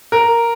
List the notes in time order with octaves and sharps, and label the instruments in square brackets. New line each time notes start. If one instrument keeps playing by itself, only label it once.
[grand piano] A#4